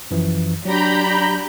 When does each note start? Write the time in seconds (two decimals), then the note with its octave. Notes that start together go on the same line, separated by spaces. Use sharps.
0.11 F#2 E3 F3
0.65 F#3 D4 G4 A#5 B5 G6